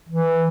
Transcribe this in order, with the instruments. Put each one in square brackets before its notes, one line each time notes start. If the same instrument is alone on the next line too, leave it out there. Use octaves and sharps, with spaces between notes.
[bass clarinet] E3